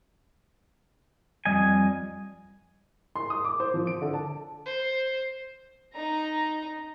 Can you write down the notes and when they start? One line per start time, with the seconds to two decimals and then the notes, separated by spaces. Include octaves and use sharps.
1.45 F2 G3 D#5 G#5
3.15 C6
3.30 D#6
3.45 D6
3.60 C5
3.74 F3
3.87 D7
4.02 D3
4.13 A5
4.66 C5
5.94 D#4 A#5